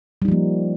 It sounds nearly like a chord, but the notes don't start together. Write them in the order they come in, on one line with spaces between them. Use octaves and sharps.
G3 D#4 F3 A#3